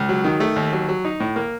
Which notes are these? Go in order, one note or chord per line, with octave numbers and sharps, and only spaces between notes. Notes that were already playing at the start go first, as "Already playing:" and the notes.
Already playing: C#2
F#3
D#3
A3
D#2
F#3
F#3
D#4
A2
A#3